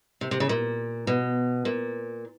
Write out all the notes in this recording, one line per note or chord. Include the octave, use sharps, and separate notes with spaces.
C3
C3
C#3
A#2
B2
A#2